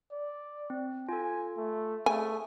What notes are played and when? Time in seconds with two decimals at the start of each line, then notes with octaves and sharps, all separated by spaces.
0.12 D5
0.70 C4
1.09 F4 A4 G#5
1.57 A3
2.06 A3 G#4 G#5